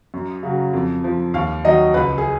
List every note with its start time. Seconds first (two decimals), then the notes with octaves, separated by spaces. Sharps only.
0.14 F#2
0.43 C#3 F#3
0.73 F2
1.04 F3
1.34 D#2 F5
1.65 D#3 F#3 D#5
1.94 C#2 B4
2.18 G#4